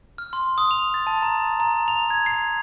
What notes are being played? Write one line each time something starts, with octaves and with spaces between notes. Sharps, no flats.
F6
C6
D#6
F7
A6
A5
A#5
A#5
F7
G#6
C7